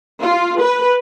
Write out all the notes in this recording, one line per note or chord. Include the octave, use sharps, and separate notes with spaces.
F4
B4